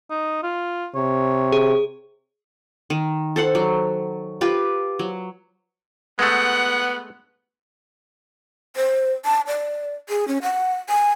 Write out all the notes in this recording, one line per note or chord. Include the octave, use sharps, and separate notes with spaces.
D#4
F4
C3 C#5
G#4
D#3
A4 C5 F#5
F#3
F4 G4 B4
F#3
G#3 A3 B3 F#5
C5
A5
D5
G#4
C#4
F#5
G#5